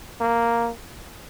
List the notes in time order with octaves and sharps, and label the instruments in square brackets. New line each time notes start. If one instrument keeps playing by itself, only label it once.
[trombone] A#3